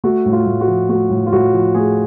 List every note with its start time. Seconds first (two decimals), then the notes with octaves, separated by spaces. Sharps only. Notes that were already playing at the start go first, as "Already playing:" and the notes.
0.04 A3 F#4
0.25 A2
0.32 F4
0.46 A2
0.61 F#4
0.68 F3
0.89 A3 F#4
1.10 A2
1.26 F4
1.32 A2 F#4
1.53 F3
1.75 A3 G#4